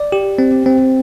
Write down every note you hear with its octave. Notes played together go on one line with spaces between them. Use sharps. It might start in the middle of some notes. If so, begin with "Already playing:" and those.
Already playing: D5
G4
C4
C4